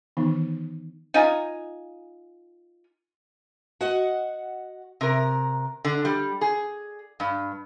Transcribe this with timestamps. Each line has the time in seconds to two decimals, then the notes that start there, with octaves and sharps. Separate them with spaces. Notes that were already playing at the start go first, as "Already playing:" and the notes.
0.17 D#3 E3 B3 D#4
1.14 D#4 F4 G#5 A#5
3.81 F#4 D#5 F#5
5.01 C3 A#4
5.85 D3
6.05 G3
6.41 G#4
7.20 G2